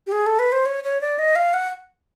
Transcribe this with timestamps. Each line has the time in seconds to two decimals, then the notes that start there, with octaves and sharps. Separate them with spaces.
0.07 G4
0.12 G#4
0.26 A4
0.39 B4
0.52 C5
0.66 C#5
0.84 C#5
1.01 D5
1.19 D#5
1.36 F5
1.54 F#5